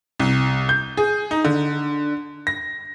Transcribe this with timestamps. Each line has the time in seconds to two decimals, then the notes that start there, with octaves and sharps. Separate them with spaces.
0.20 C2
0.69 G6
0.97 G#4
1.31 D#4
1.45 D3
2.47 A#6